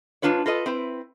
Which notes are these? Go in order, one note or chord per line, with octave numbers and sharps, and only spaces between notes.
G#2 G#3 D4 F4 B4 C#5
F4 A4 B4 D#5
C4 E4 B4